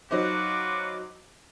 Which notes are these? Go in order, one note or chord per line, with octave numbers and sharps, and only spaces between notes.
F#3 D#4 F4 F#4 B4 C5 D6